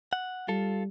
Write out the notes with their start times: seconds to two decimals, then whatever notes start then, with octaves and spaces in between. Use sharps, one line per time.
0.13 F#5
0.48 G3 F4 A4